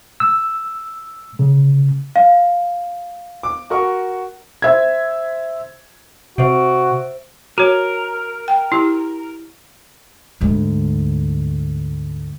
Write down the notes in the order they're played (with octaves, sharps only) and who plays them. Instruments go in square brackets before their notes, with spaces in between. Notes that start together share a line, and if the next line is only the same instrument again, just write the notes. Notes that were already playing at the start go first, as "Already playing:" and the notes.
[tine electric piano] E6
C#3
[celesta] F5
[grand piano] D6
F#4 A#4 C#6
[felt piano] C5 E5 G#6
[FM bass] C3 [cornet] F#4 [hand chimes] C5 E5 D7
[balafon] F#4 C#5 [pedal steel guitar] A#4
[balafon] G5
E4 G4
[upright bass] D2 G#2